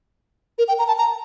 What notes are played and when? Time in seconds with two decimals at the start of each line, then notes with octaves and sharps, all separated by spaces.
0.58 A#4
0.68 G5
0.79 A#5
0.88 A5
0.98 A#5